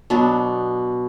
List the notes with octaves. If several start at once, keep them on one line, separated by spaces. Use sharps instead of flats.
B2 F#3 B3 D4